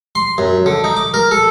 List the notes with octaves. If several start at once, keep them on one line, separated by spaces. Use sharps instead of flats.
C6
F#2
D3
D#4
D6
A#4
A4